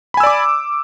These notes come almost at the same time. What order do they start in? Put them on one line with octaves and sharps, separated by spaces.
B5 G#5 E6 D5 D6